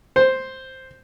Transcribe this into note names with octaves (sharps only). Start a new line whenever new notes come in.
C5